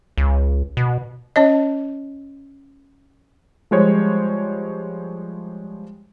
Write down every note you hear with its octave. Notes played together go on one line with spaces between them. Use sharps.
C#2
B2
C#4 C#5 D#5
F3 G3 G#3 C5 C#5